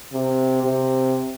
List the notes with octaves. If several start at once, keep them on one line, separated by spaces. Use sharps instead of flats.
C3
C3